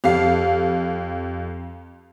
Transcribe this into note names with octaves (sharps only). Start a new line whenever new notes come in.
F2 G4 F5 C7